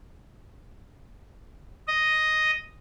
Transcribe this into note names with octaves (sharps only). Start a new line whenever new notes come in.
D#5